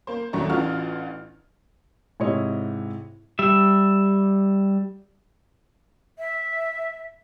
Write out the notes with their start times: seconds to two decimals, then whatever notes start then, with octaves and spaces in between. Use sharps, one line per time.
0.07 A#3 C5
0.33 D#2 F#3 A3 D4 A#5 C#6
0.49 A1 E3 D4 F4 F#4 F6
2.20 G#2 C3 E4 C#5 D#5
3.39 G3 E5
6.19 E5